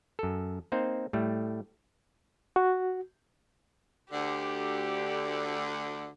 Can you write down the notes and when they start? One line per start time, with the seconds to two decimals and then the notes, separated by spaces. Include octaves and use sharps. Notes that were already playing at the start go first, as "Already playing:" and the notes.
0.19 F#2 A4
0.72 A#3 C4 D#4 C5
1.13 A2 G3 A3
2.56 F#4
4.12 D2 D3 G4